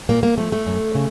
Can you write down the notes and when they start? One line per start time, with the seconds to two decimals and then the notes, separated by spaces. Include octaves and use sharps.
0.09 A#2 A#3
0.23 A#3
0.38 F3 A3
0.52 A3
0.66 F#2
0.95 C#3